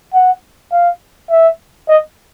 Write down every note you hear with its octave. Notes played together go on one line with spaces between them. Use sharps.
F#5
F5
E5
D#5